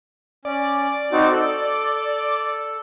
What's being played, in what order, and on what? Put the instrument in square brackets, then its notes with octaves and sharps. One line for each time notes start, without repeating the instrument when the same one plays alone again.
[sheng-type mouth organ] C#4 [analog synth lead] D5
[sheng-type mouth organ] C4 D#4 F#4
A4